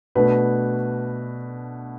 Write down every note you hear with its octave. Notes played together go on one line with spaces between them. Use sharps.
B2 A3 D4 B4